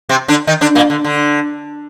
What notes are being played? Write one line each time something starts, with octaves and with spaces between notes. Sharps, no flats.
C3 C4
D3 D4
D#3 D#4
D3 D4
A#2 A#3
D3
D3